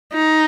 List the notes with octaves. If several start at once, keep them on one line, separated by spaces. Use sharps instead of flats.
D#4